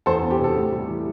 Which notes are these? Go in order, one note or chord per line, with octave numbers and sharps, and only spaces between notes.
E2 A4 C5
A4
B3
G4
C3
A4
A2
G3
E3